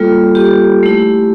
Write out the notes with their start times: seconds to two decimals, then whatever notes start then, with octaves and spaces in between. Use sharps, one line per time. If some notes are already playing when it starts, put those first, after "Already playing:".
Already playing: G3 A#3 F4 A4
0.35 G4
0.83 A3 E4